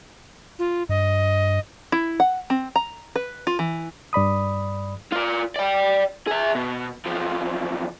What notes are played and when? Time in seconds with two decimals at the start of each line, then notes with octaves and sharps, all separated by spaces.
0.59 F4
0.89 G2 D#5
1.92 E4
2.20 F#5
2.50 C4
2.76 A#5
3.16 B4
3.47 F4
3.59 E3
4.13 G2 D5 B5 D#6
5.12 F4 D5
5.56 D5 G5
6.28 G#4 E5
6.55 B2
7.06 E2 F3